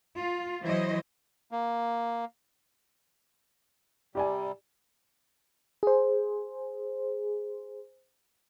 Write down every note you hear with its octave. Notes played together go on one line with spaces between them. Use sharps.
F4
E3 F#3 E4 C5 C#5 D#5
A#3
C3 G3 G4 D5 G#5
G#4 C5